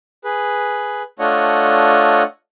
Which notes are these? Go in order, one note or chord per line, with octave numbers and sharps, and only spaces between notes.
G#4 B4
A3 D4 F4 C#5 D#5 F#5